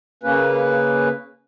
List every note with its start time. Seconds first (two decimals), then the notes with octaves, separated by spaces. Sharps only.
0.23 C#3 A#3 C#4 B4